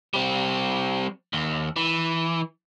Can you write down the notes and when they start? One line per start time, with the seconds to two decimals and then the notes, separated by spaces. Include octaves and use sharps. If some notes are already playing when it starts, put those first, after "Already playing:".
0.14 G3 C4
1.33 D#2
1.76 E3